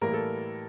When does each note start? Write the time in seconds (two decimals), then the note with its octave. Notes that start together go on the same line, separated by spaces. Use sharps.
0.01 A2 E3 G3 A#3 A#4
0.13 A4